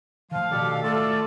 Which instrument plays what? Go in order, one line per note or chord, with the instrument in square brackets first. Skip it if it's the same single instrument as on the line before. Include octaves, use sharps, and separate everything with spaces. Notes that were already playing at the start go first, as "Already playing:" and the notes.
[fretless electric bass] A2 D#3 [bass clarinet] F3 [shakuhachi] F5
[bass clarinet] B2 [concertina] D4 G4 A4
[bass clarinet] A3 [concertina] F4 D5 A5 [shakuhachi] A4